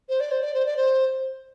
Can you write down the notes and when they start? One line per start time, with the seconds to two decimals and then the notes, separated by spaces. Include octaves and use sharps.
0.09 C5
0.20 D5
0.31 C5
0.43 D5
0.54 C5
0.66 D5
0.77 C5